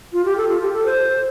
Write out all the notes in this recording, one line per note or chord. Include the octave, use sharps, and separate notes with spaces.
F4
G4
A4
F4
G4
A4
C5